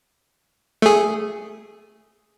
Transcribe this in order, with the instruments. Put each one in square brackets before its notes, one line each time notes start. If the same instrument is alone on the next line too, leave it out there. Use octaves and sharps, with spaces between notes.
[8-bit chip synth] A3 G#4